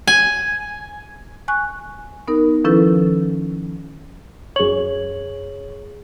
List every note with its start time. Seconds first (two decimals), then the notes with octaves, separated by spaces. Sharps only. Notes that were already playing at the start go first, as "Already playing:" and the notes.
0.07 G#5
1.48 G#5 C#6 F#6
2.28 B3 D#4 A#4
2.65 D#3 F3 C#4 E4 A4 B4
4.56 F#2 G#4 C#5 F#7